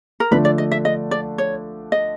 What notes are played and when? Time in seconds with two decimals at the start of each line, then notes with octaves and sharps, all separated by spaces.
0.20 A#4
0.31 D3 F3 A3 D4 B4
0.45 D5
0.58 D#5
0.72 E5
0.85 D#5
1.11 D5
1.38 C#5
1.92 D#5